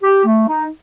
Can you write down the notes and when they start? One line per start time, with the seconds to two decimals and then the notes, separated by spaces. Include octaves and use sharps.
0.03 G4
0.25 A3
0.48 D#4